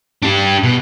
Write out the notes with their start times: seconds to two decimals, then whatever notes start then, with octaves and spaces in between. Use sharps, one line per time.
0.23 D4 G4
0.63 B2